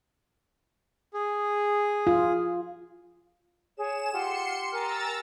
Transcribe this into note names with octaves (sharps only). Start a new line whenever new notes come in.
G#4
F4
G#4 C#5 E7
F4 G4 F#5 C6 C#7
A#4 G#5 A#5 E6 F6 A6